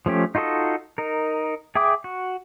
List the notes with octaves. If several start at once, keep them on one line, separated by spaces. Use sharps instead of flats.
F3 A3 C#4 G4
D#4 F4 F#4 A4 D#5
D#4 A#4
G#4 E5 G5 D6 D#6
F#4